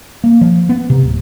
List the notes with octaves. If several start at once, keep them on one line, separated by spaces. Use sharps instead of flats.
A#3
F3
B3
C3
D1